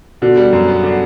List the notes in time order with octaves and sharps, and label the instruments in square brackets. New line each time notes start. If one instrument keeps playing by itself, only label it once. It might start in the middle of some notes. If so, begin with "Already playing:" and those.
[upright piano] B2 [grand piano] D3
[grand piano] G3
F#2
B3
D3